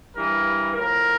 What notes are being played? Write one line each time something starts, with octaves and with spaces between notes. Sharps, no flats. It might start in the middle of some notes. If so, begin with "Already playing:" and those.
G2 E3 A#4
A2 F3 A#4